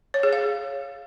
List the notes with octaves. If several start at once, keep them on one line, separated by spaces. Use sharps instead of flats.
C#5
G#4
F5